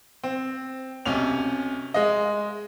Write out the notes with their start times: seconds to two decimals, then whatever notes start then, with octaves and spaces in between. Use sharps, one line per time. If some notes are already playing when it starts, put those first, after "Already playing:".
0.23 C4
1.06 B1 C3 C#4 F7
1.94 G#3 D#5